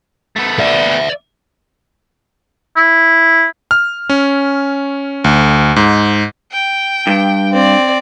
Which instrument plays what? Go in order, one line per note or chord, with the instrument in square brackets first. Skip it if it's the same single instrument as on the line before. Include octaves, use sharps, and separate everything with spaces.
[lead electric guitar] A3 B3
[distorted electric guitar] D5 E5
[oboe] E4
[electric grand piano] F6
C#4
D2
G#2
[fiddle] G5
[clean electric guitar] G2
[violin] C4 D5